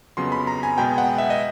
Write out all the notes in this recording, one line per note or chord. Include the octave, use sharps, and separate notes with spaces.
F2 C#3 F#3 B3 C6
B5
A#5
G#5
B2 G#3 B3 G5
F#5
E5
D#5